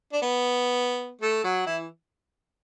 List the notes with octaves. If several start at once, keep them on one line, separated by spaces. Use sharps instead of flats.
D4
B3
A3 A4
F#3 F#4
E3 E4